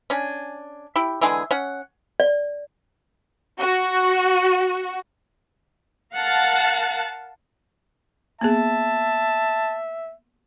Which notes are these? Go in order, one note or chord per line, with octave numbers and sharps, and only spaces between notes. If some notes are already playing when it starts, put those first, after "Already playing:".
C#4 D4 G#5
E4 G4
D3 E3 G#3 G#4
C#4 F#5
D5
F#4
A#4 F5 F#5 A5
A#3 B3 G#4 E5 A5